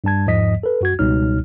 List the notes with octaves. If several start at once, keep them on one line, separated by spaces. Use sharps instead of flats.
G2 G3 A5 G#6
E2 G#2 F3 D#5 B6
A4 B4
F#2 F#4 G#6
C#2 B2 G3 D#4 C#5 F6